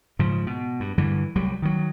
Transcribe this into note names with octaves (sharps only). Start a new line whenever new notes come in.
G#2 C#3 F3
B2
G2
G2 D3 E3
C2 F#3 G3
D#3 F#3